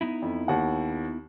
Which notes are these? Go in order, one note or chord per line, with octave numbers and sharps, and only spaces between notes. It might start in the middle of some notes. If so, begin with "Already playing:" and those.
B3 D#4 E4
F2
D#2 F#5